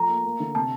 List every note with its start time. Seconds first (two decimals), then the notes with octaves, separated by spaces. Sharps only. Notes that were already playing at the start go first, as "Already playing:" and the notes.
Already playing: F3 A3 A#5
0.09 A#3
0.25 A#3
0.40 D3
0.55 C3 A5